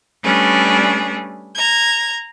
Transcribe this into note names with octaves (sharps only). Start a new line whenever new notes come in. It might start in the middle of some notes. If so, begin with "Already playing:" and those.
G3 A3 C#4 D4 G#4 B4
A#5 G#6